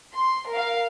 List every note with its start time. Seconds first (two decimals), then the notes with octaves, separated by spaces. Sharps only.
0.13 C6
0.49 A#4 F5